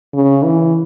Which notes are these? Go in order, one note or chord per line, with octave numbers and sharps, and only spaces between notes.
C#3
E3